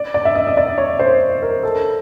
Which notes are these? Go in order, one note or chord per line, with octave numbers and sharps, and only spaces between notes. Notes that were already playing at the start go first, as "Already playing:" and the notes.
Already playing: D5
D5
E5
D#5
D#5
D5
C#5
C5
A#4
A4